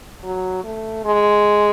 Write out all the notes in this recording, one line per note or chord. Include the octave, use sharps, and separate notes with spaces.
F#3
A3
G#3